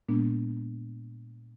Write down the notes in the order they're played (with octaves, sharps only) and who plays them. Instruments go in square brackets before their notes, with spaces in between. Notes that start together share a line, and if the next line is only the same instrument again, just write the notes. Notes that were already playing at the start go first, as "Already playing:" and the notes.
[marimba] A#2 G#3 A#3 B3 D4